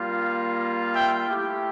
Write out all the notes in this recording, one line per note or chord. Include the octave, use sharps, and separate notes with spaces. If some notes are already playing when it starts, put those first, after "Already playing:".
Already playing: G3 A#3 F4
E5 G5
A3 E4 G4